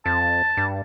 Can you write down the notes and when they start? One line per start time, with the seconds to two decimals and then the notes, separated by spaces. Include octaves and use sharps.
0.06 F2 A5
0.57 G2